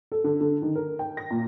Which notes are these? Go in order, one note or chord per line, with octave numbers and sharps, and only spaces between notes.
A4
D3
D3
D#3
A#4
G5
A#6
A#2